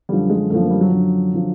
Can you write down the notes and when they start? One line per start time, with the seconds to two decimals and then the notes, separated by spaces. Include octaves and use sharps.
0.09 F#2 D3 F3 G3
0.30 G#3
0.50 F#2 D3 F3 A3
0.60 A#3
0.70 G3
0.81 F#3
0.91 F#2 D3 F3
1.34 D3 F3